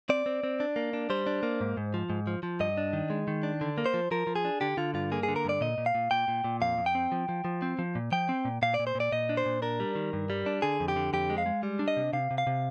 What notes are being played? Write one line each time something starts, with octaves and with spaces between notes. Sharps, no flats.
C4 D5
C4
C4
D4
A#3
D4
G3 C5
D4
A#3
G#2
G#2
F3
G#2
F3
F3
G2 D#5
D4
D#3
G#3
D#3
D4
D3
A#3
C5
F3
F3 A#4
F3
G#4
D4
D3 G4
D3 F4
G2 F4
A#3 G#4
G#4
D3
A#4
G2 D5
A#2 D#5
A#2
F5
A#2
A#2 G5
A#2
A#2
F2 F5
F2
G5
C4
F3
F3
F3
C4
F3
A#2
F3 G5
C4
A#2
A#2 F5
D5
A#2
C5
A#2 D5
A#2 D#5
D4
C5
A#2
D4 A#4
G3
D#3
G2
G3
D4
D3 G#4
F2
G4
D3
F2 G4
G#3
F5
G#3
G3
D4
D#5
C3
C3 F5
C3
F5
C3